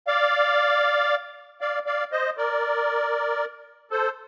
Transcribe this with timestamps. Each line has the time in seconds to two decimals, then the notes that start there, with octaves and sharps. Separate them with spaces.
0.07 D5 F5
1.61 D5 F5
1.86 D5 F5
2.12 C5 D#5
2.37 A#4 D5
3.91 A4 C5